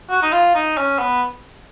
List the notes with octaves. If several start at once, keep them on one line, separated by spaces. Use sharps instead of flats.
F#4
D#4
F4
D#4
C#4
B3